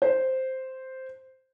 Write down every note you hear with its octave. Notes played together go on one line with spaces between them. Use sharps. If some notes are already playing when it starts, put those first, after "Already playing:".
C5